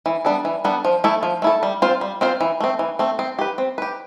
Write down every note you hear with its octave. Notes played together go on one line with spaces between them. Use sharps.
E3
G3 B3 D4 A4
E3
G3 B3 D4 A4
F3
A3 E4 A4
F3
A3 E4 A4
G3
C4 F4 C5
G3
C4 F4 C5
E3
A3 C4
E3
A3 C4
C4
G4 B4
C4
G4 B4